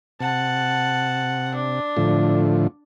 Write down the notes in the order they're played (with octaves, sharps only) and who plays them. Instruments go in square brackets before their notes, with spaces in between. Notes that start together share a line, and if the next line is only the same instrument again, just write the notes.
[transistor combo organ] C3 [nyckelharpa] F#5 A5
[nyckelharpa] D4
[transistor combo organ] A2 D3 F3